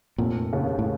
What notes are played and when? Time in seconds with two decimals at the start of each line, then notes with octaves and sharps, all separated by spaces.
0.18 F1 A#2
0.53 D#2 C#3
0.79 A2